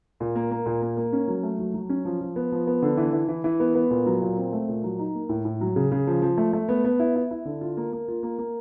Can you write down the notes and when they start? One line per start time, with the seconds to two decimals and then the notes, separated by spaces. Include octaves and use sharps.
0.20 A#2
0.36 A#3
0.51 A#3
0.66 A#2
0.82 A#3
0.97 A#3
1.13 C#4
1.28 F#3
1.43 A3
1.59 F#3
1.74 F#3
1.89 C#4
2.05 F3
2.21 F3
2.36 B3
2.52 F3
2.67 B3
2.82 D3
2.97 E3
3.13 E3
3.29 E3
3.44 E3
3.60 B3
3.75 B3
3.90 A#2
4.06 F#3
4.22 A#2
4.37 C4
4.53 A3
4.68 A#2
4.84 F#3
4.99 D#4
5.15 A#3
5.29 A2
5.45 A2
5.61 F#3
5.76 C#3
5.92 C#3
6.07 F3
6.22 F3
6.37 A3
6.53 A3
6.69 B3
6.84 B3
7.00 E4
7.16 E4
7.31 E4
7.45 D3
7.61 F4
7.77 A#3
7.92 A#3
8.08 F4
8.23 A#3
8.39 A#3